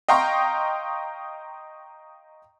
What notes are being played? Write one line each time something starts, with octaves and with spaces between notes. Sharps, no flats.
D#5 F5 G5 A#5 C6 C#6